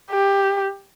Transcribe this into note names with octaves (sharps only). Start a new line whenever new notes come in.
G4